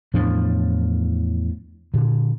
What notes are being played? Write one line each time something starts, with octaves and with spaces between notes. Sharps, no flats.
E2 A2 F3 D4
A#2 D3